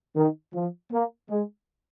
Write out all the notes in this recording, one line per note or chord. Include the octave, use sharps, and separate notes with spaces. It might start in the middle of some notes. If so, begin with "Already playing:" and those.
D#3
F3
A#3
G#3